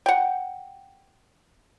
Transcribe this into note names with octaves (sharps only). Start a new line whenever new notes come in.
F#5 G5